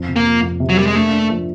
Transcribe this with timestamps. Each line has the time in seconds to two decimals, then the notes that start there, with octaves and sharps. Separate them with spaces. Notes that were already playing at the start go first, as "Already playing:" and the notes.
Already playing: F2
0.08 C3
0.16 A#3
0.26 F3
0.43 F2
0.60 C3
0.69 F#3
0.77 G3 A#3
0.87 G#3
0.95 A3 D4
1.12 D4
1.30 F3